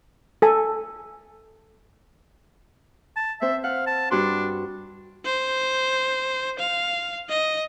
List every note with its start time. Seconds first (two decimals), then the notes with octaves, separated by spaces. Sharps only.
0.42 A4 G#5
3.17 A5
3.41 C4 C5 E5
3.64 F5 F#5
3.87 A5
4.11 G2 D4 F#4 C6
5.26 C5
6.59 F5
7.29 D#5